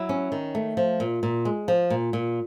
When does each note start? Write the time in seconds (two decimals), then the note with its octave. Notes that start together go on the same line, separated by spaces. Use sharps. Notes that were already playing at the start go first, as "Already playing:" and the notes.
Already playing: F#3 E4
0.09 C#4
0.32 D#3
0.55 A3
0.77 F3
1.00 A#2
1.23 A#2
1.45 G#3
1.68 F3
1.90 A#2
2.13 A#2